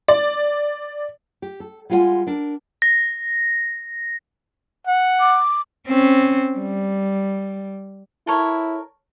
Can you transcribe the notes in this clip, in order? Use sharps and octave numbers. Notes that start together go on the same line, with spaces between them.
D5
G4
A4
G3 G#3 F4 A#4 F#5 G#5
D4 A#4
A#6
F#5
D6
C4 C#4
G3
E4 A4 A#4 C#5